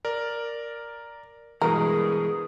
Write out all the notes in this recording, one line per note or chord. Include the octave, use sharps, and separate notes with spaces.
A#4 D5
G2 B2 E3 G#3 G#4 A#4